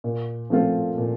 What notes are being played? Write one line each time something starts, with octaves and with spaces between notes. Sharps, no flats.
A#2
F3 A3 C4 F4
A#2